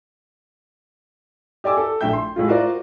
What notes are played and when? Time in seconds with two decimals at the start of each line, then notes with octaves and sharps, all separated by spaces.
1.64 G4 D5 G#5 D6 E6
1.77 A4
2.01 A#1 A3 E5 G5 G6
2.13 C6
2.36 A2 G#3 F4
2.48 F4 F#4 A#4 C5 D5